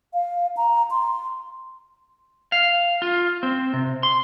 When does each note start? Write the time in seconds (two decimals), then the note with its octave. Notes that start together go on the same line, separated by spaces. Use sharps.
0.14 F5
0.57 A#5
0.91 C6
2.52 F5
3.02 F4
3.43 C4
3.73 C3
4.03 C6